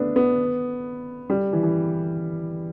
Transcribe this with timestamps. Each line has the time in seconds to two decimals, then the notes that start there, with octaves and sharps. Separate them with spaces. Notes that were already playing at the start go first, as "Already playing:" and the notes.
Already playing: A3 B3 D4
0.16 B3
1.30 G3
1.53 E3
1.63 E3